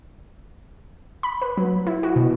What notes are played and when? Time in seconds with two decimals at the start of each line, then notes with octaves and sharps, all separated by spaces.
1.23 B5
1.42 B4
1.57 F#3
1.87 E4
2.03 F#4
2.16 B2